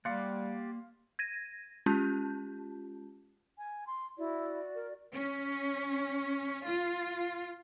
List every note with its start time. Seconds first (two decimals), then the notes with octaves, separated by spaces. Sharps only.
0.05 G3 A#3 G4 D5 F5 F#5 C6 C#7
1.19 G#6 A#6 D#7
1.86 G#3 C#4 F4 G4 A5 G6
3.58 G#5
3.87 C6
4.18 E4 F#4 D5
4.75 A#4
5.14 C#4
6.68 F4